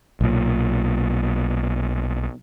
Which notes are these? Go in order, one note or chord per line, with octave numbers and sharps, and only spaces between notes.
B1 A#2